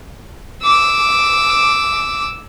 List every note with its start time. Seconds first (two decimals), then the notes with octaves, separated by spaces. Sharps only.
0.63 D6 E6